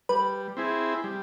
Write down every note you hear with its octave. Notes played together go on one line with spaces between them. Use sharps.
G3 B4
C4 E4 G#4
G3